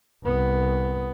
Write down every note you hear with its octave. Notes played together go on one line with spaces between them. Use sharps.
C2 B3